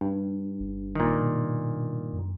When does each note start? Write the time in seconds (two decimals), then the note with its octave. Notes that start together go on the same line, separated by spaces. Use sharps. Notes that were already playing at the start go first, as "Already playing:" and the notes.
0.01 G2
0.60 G1
0.95 A#2 D#3
1.21 B2
2.13 F#2